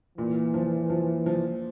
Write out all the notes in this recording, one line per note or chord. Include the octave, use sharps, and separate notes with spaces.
A#2 E3
F3
F3
F3